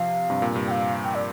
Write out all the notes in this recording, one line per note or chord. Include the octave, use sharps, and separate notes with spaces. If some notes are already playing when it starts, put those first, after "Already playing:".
Already playing: C3 F3 F5
G2 C3
A#2
G2 C3
G5
F5
G5
D5